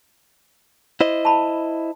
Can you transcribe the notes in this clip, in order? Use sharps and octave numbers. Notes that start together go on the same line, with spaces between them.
E4 C5 D#5
A5 B5